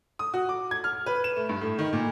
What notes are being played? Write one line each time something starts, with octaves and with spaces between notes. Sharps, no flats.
D#6
F#4
D6
G#6
F6
B4
E7
A3
G2
A2
D#3
A#2